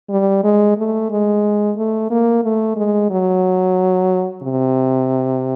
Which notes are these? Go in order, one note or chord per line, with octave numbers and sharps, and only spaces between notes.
G3
G#3
A3
G#3
A3
A#3
A3
G#3
F#3
C3